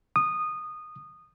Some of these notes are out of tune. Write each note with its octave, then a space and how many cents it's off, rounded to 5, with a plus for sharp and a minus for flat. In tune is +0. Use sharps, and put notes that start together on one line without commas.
D#6 -15